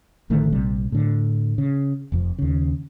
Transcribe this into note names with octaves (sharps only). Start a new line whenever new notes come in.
A1 D3 D#3 A3
A#1 C3 G3
A2 D3
C#3
F1 F2 F3
D#2 C#3